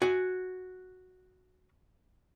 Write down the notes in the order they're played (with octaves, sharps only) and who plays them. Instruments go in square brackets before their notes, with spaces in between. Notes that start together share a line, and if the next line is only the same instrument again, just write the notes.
[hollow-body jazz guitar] F#4 G#5